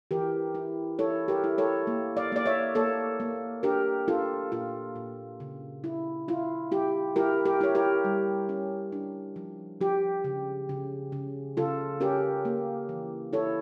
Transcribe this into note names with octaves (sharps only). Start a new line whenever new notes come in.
E3 G4 A#4
E4
E4 A4 C#5
G4 A#4
E4
A4 C#5
A#3
D5 F5
A#3 D5
C#5 E5
A#3 A4 C#5
A#3
D4 G4 A#4
D4 F4 A4
A#2 F4
A#2
C#3
E4
E4 F4
E4 G4
E4 G4 A#4
G4 A#4
E4 C#5
G4 A#4
G3
C#4
D4
F3
F3 G4
C#3
C#3
C#3
C#3 F4 A4
C#4 G4 A#4
A#3
E3
E4 A4 C#5